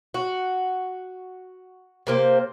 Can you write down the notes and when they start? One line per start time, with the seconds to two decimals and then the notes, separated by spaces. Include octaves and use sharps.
0.14 F#4
2.07 C3 A#3 C5